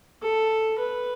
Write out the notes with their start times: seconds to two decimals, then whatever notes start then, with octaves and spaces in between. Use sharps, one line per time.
0.23 A4
0.79 B4